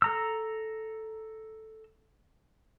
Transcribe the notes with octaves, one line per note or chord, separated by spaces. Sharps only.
A4 A#5 E6